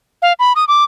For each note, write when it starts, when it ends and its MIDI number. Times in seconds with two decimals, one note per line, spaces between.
0.22 0.33 77
0.39 0.53 83
0.56 0.64 87
0.68 0.84 86